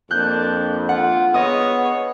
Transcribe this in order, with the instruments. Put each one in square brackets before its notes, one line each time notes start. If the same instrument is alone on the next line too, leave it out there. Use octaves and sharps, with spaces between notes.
[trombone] F2 [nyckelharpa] A#3 D4 [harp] F#6 G6
[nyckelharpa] F4 [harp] F#5
[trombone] B3 [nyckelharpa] G#4 C#5 [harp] D#5 D#6